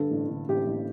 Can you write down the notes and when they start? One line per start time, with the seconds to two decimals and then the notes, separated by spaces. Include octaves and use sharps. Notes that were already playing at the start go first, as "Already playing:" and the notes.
Already playing: G2 D3 A4
0.11 A1
0.29 D3
0.48 A1 G4
0.67 A1